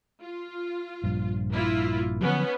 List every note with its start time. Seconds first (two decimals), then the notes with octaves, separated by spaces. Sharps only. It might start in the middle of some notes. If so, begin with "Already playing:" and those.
0.21 F4
1.04 A#1 G2
1.52 A#3 E4 F4
2.21 D3 F3 F#3 B3 C#4